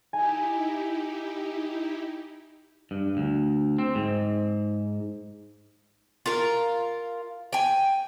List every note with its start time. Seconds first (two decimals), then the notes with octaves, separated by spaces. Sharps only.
0.13 D#4 E4 G4 G#5
2.91 G2
3.17 D2
3.78 C4
3.95 G#2
6.26 F4 A#4
7.53 G5 G#5